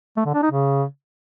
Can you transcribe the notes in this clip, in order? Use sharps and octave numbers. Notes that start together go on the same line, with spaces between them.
A3
D3
D4
D#4
C#3